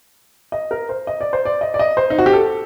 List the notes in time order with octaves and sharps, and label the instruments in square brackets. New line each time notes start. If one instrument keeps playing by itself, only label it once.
[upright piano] D#5
A#4
C5
D#5
D5
C5
D5
D#5
D5
D#5
C5
D#4
F#4
G4
A4